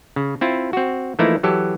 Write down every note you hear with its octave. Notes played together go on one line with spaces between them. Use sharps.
C#3
C4 E4 F4
C4 F#4
E3 F3 A3 A#3 D#4 E4
E3 F#3 G4 A4